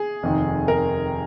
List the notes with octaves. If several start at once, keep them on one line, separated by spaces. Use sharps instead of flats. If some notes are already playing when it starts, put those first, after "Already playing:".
Already playing: G#4
F1 D#2 D#3
A#4